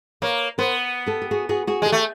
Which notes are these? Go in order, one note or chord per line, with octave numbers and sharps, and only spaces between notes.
A#3 B4 C#5
B3 A#4 C5
G4 A4
G4
F#4 G#4
F#4 G#4
F#4 G#4
G#3 G4 A4
A3